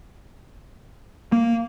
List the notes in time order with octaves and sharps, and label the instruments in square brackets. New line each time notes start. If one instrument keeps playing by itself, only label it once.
[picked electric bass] A#3